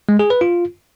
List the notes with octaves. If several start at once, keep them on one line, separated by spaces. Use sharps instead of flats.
G#3
G#4
B4
F4